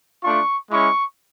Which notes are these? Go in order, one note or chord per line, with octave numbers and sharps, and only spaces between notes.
A3 D4 F4 C#6
G#3 C#4 E4 C#6